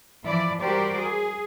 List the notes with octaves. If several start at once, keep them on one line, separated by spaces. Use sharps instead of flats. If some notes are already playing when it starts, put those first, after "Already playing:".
E3 F3 E4 D5 E5
G3 F#4 G4 A#4 C5 D5
G#4